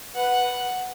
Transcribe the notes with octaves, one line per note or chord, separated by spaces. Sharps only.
B4 F#5